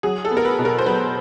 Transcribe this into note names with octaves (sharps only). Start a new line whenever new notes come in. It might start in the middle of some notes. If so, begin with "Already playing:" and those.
F#3 G#4
A4
B3
A#4
B4
B2
A#4
C5
F#3 B4